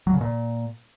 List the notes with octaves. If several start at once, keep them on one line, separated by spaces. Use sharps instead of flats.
F#3
C#3
A#2